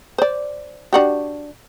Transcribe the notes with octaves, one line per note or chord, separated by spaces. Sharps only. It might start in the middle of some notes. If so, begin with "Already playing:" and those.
C5 D5
D4 F#4 G4